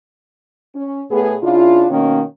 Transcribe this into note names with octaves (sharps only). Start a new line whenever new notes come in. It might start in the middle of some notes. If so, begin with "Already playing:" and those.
C#4
A2 B3 G#4
C#3 D4 E4 F4
B2 D#3 A#3 C#4